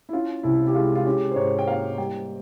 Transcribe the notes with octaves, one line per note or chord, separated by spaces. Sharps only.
E4
C#4 F4
C2 E4
G4
G#3 F4
F4
C#4 G4
C5
G#2 C#5
G5
A#3 F5
G3 G5